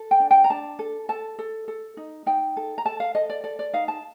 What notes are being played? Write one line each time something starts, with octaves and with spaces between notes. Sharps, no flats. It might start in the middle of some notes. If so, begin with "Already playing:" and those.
Already playing: A4
G5
D4
G5
A#5
D4 A5
A4
A4 A5
A4
A4
D#4
D#4 G5
A4
A#5
A4 A5
F5
A4 D#5
D5
A4 D5
D5
D#4 F5
A5